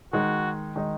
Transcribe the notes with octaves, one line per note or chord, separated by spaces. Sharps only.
D#3 G#3 D#4 F#4
D#3 G#3 D#4